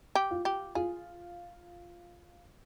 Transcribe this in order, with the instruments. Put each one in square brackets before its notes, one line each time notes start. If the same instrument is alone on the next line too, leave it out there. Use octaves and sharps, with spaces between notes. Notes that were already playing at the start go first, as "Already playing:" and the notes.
[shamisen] G4
[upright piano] F4
[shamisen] G4
[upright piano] F4 [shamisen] G#4